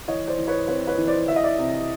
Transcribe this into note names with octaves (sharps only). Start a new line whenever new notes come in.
E3 C#5 D#5
C5 D5
E3
B4 C#5
C4 B4 C#5
B4 C#5
E3
C5 D5
E3 E5
D#5
D5 E5
C3